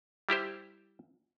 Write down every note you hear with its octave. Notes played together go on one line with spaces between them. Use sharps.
G3 E4 G4 C5